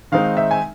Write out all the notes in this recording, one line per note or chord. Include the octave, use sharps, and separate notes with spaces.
D#3 G#3 C4 D#4 F5
E5
G#5